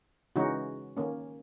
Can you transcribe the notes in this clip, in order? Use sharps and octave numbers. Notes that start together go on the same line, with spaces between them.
C#3 E3 G#3 C#4 D#4 F#4
D#3 A#3 C#4